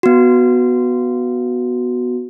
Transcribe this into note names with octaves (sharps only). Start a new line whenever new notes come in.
B3 F#4